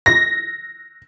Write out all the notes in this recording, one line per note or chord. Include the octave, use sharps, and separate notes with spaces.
A#6